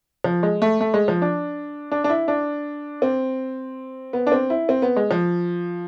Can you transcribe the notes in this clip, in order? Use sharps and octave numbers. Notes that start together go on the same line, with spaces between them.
F3
G#3
A3
A3
G#3
F3
D4
D4
D4
E4
D4
C4
B3
D4
C4
E4
C4
B3
G#3
F3